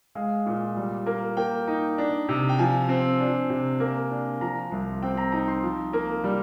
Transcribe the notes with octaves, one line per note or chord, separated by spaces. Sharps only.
G#3 F5
A#2
G3
A#3
A#3 G5
D#4
D4
C3
G5
F3 G#5
C4
D4
C3
A#3
D4
F3 A#5
C2
C4 G5
A#5
D#4 A#5
C6
F3
A#3
G3